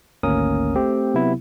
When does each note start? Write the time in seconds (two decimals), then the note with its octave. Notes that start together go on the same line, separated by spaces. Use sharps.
0.23 G#1 D2 A#3 C#4 A#4 D#6
0.75 A3 C4 G4
1.14 C3 F#3 B3 E4